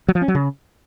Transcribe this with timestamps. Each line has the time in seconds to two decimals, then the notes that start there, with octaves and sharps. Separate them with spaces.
0.08 F#3
0.15 F3
0.22 C#4
0.28 F#3
0.35 C#3